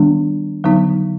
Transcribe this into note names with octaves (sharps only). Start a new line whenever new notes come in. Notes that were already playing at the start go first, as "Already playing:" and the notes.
Already playing: D#3 G3 B3 D4
D3 F#3 B3 D#4